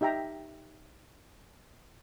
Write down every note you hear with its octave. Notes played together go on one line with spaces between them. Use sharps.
D#4 G4 E5 G5 A#5